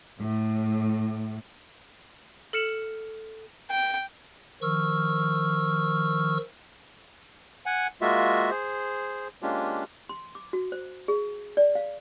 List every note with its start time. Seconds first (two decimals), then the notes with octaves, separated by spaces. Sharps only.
0.19 A2
2.53 A4 F6 C#7 E7 F#7
3.70 G5
4.62 D#3 F3 C#6 E6 F6
7.66 F#5 G#5
8.01 G#3 A#3 F4 F#4 E5
8.51 G#4 C5
9.42 G#3 A#3 C#4 D4 F4 G4
10.09 C6
10.35 D6
10.53 F#4
10.72 C5
11.08 G#4
11.57 D5
11.75 F5